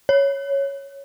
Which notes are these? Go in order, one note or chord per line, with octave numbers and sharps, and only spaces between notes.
C#5